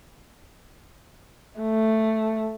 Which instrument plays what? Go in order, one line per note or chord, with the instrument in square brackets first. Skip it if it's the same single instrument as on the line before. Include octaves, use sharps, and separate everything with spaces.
[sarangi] A3